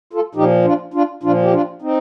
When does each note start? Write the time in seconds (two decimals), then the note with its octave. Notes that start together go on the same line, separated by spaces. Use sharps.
0.13 F4 A4
0.35 A#2 F3 D#4 G4
0.65 D4 F4
0.94 D4 F4
1.23 A#2 F3 D4 F4
1.43 G4
1.53 D4 F4
1.82 C4 D#4